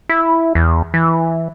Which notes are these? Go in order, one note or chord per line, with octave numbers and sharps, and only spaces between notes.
E4
E2
E3